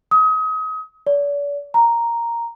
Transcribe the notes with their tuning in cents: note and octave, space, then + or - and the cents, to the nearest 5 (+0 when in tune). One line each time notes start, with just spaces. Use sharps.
D#6 +30
D5 -45
A#5 +0